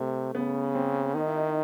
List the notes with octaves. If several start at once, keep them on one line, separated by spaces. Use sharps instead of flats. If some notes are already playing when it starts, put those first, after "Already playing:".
Already playing: C3 A3
C#3 B3
C4
D#3 D#4
E4
D#4